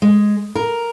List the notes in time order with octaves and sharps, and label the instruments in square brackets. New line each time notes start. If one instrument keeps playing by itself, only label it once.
[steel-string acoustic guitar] G#3
A#4